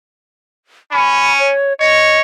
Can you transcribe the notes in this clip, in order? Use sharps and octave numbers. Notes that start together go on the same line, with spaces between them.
C#4 B5
C#5
C#5 D#5